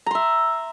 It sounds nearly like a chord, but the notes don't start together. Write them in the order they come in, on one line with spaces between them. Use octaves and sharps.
A#5 C6 E5